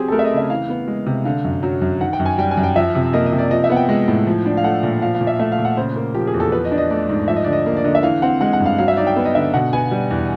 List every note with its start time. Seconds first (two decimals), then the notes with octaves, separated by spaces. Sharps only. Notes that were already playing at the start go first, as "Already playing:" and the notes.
Already playing: F#3 C4 G4 G#4
0.08 A4
0.12 A3 A#4
0.19 E5
0.25 D#5
0.31 C#3
0.38 E5
0.50 E3 F5
0.69 B3
0.88 G#3
1.06 C3
1.25 D3 F5
1.44 F#2
1.63 F#3
1.81 F#2
2.01 D#3 F#5
2.13 G5
2.19 F#2
2.26 G#5
2.38 G3 G5
2.51 G#5
2.57 F#2
2.63 G5
2.76 F3 E5
2.95 C3
3.13 A#3 D#5
3.26 D#5
3.32 C3
3.39 D5
3.51 F3 D#5
3.64 E5
3.70 B3 F#5
3.76 G5
3.89 G#3
4.08 A2
4.27 F3
4.46 D4
4.57 F5
4.64 A3 F#5
4.83 A#2
5.02 F3 F5
5.15 F5
5.21 A#2
5.27 E5
5.39 A3 E5
5.52 F5
5.58 A#2
5.65 F#5
5.77 C#3 C5
5.96 A#3
6.14 F3 G4
6.27 G#4
6.34 E2
6.40 A4
6.52 F3 B4
6.65 D#5
6.72 D4
6.78 D#5
6.90 A3 D5
7.09 G#2
7.28 F3 E5
7.36 D#5
7.44 D3 D5
7.53 D#5
7.66 A#3
7.77 D5
7.84 D3 D#5
7.95 E5
8.03 E3 F5
8.22 C4 F#5
8.41 G#3 F#5
8.53 F#5
8.60 G2
8.66 F5
8.78 F#3 F5
8.88 E5
8.97 D#4 D5
9.07 G5
9.16 B3
9.25 D#5
9.35 D3 E5
9.54 B2 F#5
9.73 B3 G#5
9.91 G3
10.10 E2